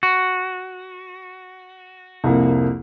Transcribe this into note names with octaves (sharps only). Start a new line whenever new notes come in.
F#4
C2 F2 A#3